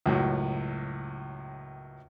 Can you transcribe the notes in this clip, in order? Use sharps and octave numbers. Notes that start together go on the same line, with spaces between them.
C#2 F#2 A2